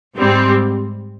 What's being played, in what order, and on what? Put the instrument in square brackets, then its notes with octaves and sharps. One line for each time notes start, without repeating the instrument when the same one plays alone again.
[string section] G#2 G3 C4